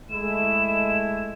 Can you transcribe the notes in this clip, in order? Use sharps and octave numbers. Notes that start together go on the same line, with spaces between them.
G#3 A3 E4 E7